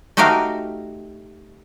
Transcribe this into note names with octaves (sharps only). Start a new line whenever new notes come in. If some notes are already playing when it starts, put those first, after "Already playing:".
A3 D#4 F#4 G4 A#4 F5